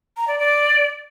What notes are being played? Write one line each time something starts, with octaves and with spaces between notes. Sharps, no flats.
A#5
D5
D5